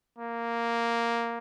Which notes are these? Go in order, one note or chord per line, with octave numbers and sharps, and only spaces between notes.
A#3